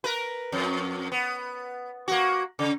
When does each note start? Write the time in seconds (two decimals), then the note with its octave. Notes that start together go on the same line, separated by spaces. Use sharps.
0.04 A#4 B4
0.52 F2
1.12 B3
2.08 A#3 F#4
2.59 C#3